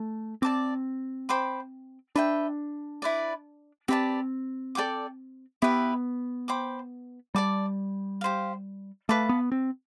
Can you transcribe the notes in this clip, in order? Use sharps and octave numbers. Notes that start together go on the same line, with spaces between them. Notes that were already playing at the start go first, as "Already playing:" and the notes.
Already playing: A3
C4 D5 A5 D6
C5 G5 B5 D6
D4 B4 E5 G5
E4 B4 D5
C4 G4 B4 D5 A5
A4 D5 G5 D6
B3 E4 G4 B4 E5
C5 G5 B5 D6
G3 D5 A5 D6
G4 C5 F5
A3 B4 F5 A5 D6
B3
C4